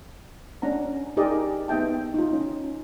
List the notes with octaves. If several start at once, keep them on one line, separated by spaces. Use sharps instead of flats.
C#4 D4 F#5 A#5
D#4 G4 G#4 A#4 D5 D#5
B3 D#4 D#5 E5 G5 A5
D#4 F4
C#4